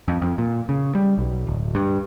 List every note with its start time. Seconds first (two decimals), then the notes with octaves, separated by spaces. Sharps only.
0.08 F2
0.22 F2
0.38 A#2
0.69 C#3
0.95 G3
1.18 B1
1.47 D1
1.75 G2